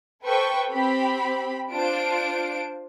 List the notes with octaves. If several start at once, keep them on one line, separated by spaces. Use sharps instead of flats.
A4 B4 C5 G5 C#6
C4 G4 B5
D4 F4 C5 D7